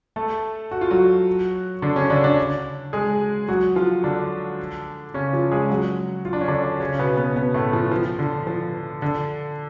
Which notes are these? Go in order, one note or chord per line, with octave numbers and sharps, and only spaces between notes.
A3 A4
F#4
F4
F#3 F#4
D3 D4
C#3 C#4
D3 D4
D3 D4
G#3 G#4
F#3 F#4
F3 F4
D3 D4
C#3 C#4
F3 F4
G#3 G#4
F#3 F#4
F4
D4
C#4
D3 D4
C#3 C#4
B2 B3
B2 B3
B2 B3
A2 A3
F3
F3
D3
F3
D3